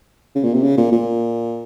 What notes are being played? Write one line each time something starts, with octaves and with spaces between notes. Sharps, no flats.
C#3
A#2
C3
C#3
A#2
A#2